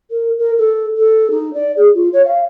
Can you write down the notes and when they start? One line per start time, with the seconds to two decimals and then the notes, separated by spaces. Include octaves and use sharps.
0.11 A#4
0.38 A#4
0.58 A4
0.97 A4
1.31 D#4
1.54 D5
1.76 G#4
1.94 F4
2.13 C#5
2.26 F5